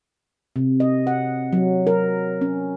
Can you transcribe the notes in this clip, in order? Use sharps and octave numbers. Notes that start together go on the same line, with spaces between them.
C3
D#5
F#5
F#3
A#4
C#4